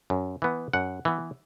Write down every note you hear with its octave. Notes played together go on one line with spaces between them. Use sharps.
F#2
E3 B3
F#2 F#5
E3 B3